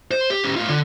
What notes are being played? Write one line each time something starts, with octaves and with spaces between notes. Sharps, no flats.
C5
G4
C#4 G4
A2 F4
D3